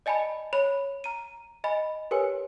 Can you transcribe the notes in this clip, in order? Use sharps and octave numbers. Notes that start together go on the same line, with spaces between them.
D5 D#5 G#5 A5 B5
C#5 B5 F7
A#5 D#7
D#5 G#5 B5
G4 A#4 B4 C#5 G#5